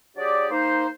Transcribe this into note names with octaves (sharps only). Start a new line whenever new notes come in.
F#3 D4 G4 G#4 D5
A#3 D#4 C5